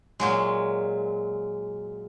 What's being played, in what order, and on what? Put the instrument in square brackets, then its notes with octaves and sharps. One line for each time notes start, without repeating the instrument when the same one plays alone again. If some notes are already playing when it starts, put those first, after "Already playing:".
[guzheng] A#2 F#3 G#3